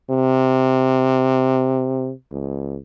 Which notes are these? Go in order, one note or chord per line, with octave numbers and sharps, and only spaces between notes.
C3
C#2